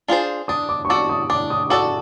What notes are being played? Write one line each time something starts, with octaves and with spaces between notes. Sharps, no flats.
D4 F4 G#4 C5
D4 D#6
D6
C#6
F#4 A4 D5 D6
D#6
D4 D6
D#6
F#4 A4 D5 D6